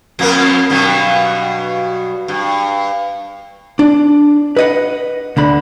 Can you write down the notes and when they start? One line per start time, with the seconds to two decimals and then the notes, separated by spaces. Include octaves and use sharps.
0.19 F2 A#3 B3
0.70 G2 B2 F#3
2.28 G2
3.79 D4
4.57 B4 D#5 F#5
5.37 D2 D3 B5